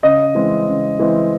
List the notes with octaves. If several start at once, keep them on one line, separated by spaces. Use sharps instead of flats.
C#3 D#5
E3 G#3 C4
C#3
E3 G#3 C4